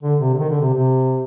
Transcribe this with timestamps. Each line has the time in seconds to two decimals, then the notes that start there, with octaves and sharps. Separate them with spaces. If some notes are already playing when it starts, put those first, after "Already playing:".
0.03 D3
0.20 C3
0.34 D3
0.39 D#3
0.50 D3
0.61 C3
0.73 C3